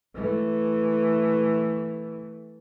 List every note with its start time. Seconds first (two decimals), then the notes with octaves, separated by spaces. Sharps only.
0.15 E3 A3